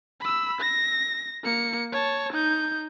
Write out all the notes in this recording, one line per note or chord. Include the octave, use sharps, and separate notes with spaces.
B5 E6
A#6
A#3 C#7
C#5 A5
D#4 G6